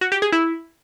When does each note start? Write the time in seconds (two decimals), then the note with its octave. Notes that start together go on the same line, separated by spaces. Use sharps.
0.01 F#4
0.12 G4
0.22 G#4
0.32 E4